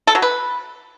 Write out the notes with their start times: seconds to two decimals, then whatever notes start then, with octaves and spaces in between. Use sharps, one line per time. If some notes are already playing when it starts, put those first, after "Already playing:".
0.07 A4
0.15 F#3
0.22 B4